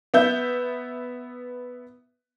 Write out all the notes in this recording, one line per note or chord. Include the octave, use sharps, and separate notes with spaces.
B3 E5 G6